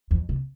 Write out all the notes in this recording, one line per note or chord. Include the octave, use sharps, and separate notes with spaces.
F2
C3